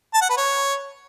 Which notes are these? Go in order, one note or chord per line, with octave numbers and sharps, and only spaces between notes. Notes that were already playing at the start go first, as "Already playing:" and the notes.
A5
F#5
B4
C#5